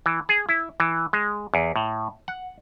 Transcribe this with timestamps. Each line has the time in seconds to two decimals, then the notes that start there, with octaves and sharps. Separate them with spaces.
0.06 E3
0.29 G#4
0.49 E4
0.80 E3
1.13 G#3
1.54 E2
1.76 A2
2.28 F#5